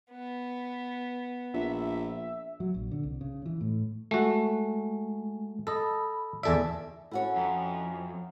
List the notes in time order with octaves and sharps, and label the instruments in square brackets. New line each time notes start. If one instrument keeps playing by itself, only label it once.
[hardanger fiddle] B3
[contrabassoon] A#1 [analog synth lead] E5
[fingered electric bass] F#3
A#1
D3
C2
C#3
E3
A2
[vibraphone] G#3 [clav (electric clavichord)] A3 F#4
[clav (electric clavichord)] A4 D#5 [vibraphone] B5
[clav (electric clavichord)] E2 A4 E5 [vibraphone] D5 G#5
[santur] E5
[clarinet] C#4 [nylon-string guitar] E4 F#4 C#5 [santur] A4 F#5
[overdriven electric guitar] F2 [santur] A#5